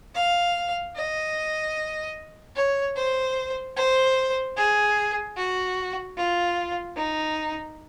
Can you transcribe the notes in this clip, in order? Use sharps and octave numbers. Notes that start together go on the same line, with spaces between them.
F5
D#5
C#5
C5
C5
G#4
F#4
F4
D#4